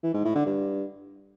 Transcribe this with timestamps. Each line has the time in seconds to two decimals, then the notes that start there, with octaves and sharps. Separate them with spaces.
0.03 E3
0.14 G#2
0.25 A2
0.35 D3
0.46 G2